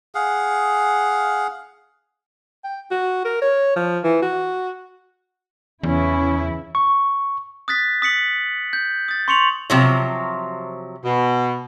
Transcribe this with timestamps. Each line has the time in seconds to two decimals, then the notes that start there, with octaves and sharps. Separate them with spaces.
0.15 G#4 F5 F#5
2.64 G5
2.91 F#4
3.25 A#4
3.42 C#5
3.76 F3
4.04 E3
4.22 F#4
5.83 E2 C#3 E3 C#4 E4
6.75 C#6
7.68 D#6 F#6 A6 B6
8.02 D#6 B6 C#7 F#7
8.73 G6
9.08 D#6 A6
9.28 C6 C#6 C#7 F7 F#7
9.70 C3 F3 F#3
11.05 B2